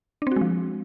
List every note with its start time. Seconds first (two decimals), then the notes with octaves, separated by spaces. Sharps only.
0.22 D4
0.27 C4
0.32 F#4
0.36 G#3
0.41 F3